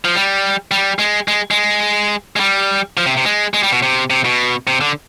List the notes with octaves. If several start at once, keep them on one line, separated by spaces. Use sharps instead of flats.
F3
G3
G3
G#3
G#3
G#3
G#3
G3
F3
C3
C3
G#3
G#3
G3
B2
C3
C3
B2
C3
D3